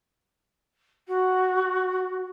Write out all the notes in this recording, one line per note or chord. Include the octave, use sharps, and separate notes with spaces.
F#4